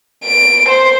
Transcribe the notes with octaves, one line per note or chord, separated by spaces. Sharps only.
D7
C5